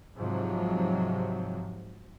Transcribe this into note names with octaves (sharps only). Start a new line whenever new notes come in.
G#2 C3 F3 F#3